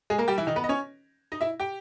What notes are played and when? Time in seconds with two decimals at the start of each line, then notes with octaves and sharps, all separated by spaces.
0.10 G#3 G#4
0.18 A#3 A#4
0.28 G3 G4
0.38 E3 E4
0.47 D#3 D#4
0.56 B3 B4
0.64 D#5
0.69 C#4 C#5
1.32 D#4 D#5
1.41 E4 E5
1.60 G4 G5